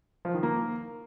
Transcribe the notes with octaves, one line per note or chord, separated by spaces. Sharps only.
F3
D#3
A#3